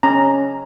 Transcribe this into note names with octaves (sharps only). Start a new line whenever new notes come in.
C#4 A#5